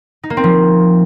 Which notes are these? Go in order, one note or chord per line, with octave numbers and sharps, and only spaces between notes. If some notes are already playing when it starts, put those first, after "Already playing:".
D#4
A#3
C4
F3